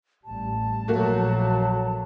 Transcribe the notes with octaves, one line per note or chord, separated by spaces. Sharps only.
A1 G3 A5
A#1 F#3 A3 A#3 F#4